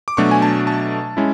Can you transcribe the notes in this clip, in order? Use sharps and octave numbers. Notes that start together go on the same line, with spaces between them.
D6
B2 F#3 A3 D4 C#6
G#5
A5
A5
G#3 C#4 E4